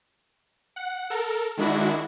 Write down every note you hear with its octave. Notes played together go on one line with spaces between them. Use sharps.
F#5
A4 A#4
D#3 G#3 D4 E4 F#4